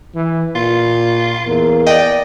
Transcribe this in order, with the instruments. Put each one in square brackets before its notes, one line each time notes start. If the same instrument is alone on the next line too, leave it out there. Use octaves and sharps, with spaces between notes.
[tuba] E3
[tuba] A#2 [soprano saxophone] F4
[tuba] E2 [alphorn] A#3
[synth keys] D5 D#5 [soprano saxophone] G5